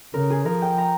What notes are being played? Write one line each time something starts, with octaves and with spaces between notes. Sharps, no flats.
C#3 A#4
G#4
F3 A#4
G5
A#5